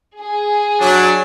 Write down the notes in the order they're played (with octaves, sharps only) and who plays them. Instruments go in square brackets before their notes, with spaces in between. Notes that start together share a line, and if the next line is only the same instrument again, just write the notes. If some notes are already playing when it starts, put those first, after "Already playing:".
[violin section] G#4
[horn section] F#3 D4